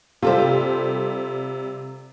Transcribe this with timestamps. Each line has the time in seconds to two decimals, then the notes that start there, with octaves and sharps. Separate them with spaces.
0.22 C3 G3 F4 A4 C5